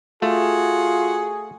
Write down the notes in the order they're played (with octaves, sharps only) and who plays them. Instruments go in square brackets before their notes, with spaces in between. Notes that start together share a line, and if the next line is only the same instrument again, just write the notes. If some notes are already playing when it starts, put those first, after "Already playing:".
[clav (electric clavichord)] A3 [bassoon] F4 [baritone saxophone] F#4 [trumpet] G#4